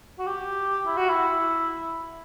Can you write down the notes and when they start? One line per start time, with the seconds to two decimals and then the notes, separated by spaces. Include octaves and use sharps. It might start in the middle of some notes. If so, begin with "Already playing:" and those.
0.19 F#4
0.27 G4
0.87 E4
0.97 F#4
1.09 E4